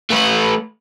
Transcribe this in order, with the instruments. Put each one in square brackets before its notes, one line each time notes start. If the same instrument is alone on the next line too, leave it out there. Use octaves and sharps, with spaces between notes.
[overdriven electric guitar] A3 B4